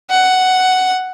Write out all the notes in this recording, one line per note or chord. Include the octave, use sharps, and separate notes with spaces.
F#5